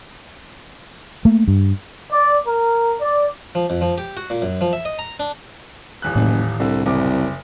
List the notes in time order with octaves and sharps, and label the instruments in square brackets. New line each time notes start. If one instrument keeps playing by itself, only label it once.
[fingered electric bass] A3 A#3
G2
[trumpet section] D5
A#4
D5
[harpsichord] F3
F2
F3
G4
F#4
A#2
F#2
F3
E5
D#5
A#5
D4
[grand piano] D#1 E2 F#6
[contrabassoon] F#1 [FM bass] A2
[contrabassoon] C2 [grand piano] D3
[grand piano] F#1 D6 [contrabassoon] C2